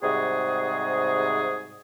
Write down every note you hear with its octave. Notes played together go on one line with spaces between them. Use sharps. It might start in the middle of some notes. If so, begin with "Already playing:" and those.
G#2 C3 G3 F#4 G#4